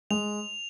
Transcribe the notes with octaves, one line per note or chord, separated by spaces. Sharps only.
G#3 F7